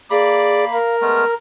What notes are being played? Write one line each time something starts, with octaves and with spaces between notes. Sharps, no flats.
A#3 G#4 D5 B5
A#4 F5
G#3 A3 B3 F6